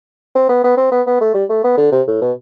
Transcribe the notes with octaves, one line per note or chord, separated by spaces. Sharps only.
C4
B3
B3
C4
B3
B3
A3
G3
A3
B3
D3
C3
A2
B2